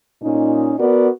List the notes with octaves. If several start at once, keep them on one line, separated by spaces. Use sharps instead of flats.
A#2 C#4 D#4
B3 F#4 A#4 D5